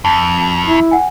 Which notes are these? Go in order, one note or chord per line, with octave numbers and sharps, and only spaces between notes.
F2 A5
E4
F#5 G#5